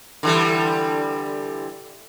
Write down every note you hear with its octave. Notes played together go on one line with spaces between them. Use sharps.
D3 E3 G3